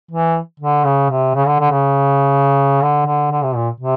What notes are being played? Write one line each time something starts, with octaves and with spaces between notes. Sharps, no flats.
E3
D3
C#3
C3
C#3
D3
D3
C#3
D3
D3
D3
C3
A#2
C3